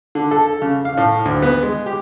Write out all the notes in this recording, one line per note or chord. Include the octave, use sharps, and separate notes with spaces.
D3
A4
C#3
F5
A2
D2
B3
G#3
G4